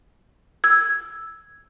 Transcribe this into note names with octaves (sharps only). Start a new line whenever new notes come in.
E6 G#6